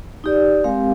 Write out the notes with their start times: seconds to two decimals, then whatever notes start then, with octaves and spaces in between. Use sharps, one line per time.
0.24 D#4 G4 D5
0.64 G#3 C4 G4 A#4 F5